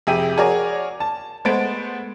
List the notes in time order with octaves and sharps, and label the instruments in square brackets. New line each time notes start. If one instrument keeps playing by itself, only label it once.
[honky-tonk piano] F2 C3 G#4 E5 G5 D#7
F#4 G#4 A#4 C#5 D5 G#5
A5
G#3 A3 B3 C5 A6 D7